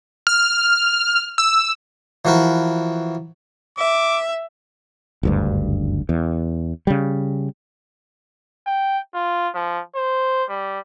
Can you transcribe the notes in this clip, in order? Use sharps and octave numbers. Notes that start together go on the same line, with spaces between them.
F6
E6
E3 F3 F#4 A#4 B4
E5 D6
F#1 D2 G2
E2
C#3 G3
G5
F4
F3
C5
G3